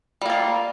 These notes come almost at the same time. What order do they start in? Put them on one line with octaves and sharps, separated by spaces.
G3 A#3 F4